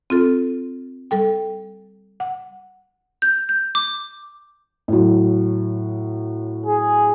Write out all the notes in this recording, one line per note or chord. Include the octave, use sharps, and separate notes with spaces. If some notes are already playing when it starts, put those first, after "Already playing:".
C4 F4 A4
G3 A4 G5
F#5
G6
G6
D6
A2 F#3
G#4